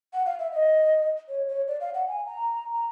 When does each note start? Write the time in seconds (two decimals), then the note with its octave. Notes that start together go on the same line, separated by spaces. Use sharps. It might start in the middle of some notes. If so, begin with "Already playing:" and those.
0.13 F#5
0.26 F5
0.39 E5
0.52 D#5
1.29 C#5
1.48 C#5
1.68 D5
1.81 F5
1.94 F#5
2.07 G#5
2.26 A#5
2.73 A#5